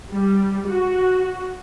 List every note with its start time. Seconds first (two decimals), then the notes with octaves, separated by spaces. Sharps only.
0.11 G3
0.68 F#4